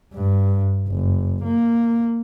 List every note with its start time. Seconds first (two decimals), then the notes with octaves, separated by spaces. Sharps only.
0.14 G2
0.88 F#1
1.44 A#3